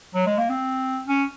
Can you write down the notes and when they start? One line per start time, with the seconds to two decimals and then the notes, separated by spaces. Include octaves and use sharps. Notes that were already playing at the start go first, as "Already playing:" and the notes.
0.14 F#3
0.26 G#3
0.38 A#3
0.49 C4
1.07 C#4